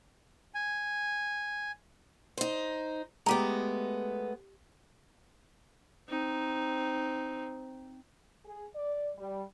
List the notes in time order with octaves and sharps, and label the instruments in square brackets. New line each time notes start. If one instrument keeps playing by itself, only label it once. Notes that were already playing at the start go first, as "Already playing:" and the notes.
[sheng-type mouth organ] G#5
[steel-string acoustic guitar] D#4 C5
[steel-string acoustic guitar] G#3 A3 B3 [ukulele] G4 A#5
[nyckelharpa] C4 D#4
[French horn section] G#4
D5
G3